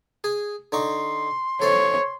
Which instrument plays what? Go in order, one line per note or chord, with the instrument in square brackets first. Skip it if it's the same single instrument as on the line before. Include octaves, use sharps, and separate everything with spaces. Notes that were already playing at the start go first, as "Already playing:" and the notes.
[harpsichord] G#4
[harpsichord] D3 D#4 C#6 [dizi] C6
[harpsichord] A4 C5 [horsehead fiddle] C#5